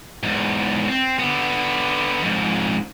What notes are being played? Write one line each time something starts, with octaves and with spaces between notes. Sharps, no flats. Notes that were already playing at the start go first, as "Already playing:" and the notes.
E2 G#2
C4
D3 B3
F2 G#2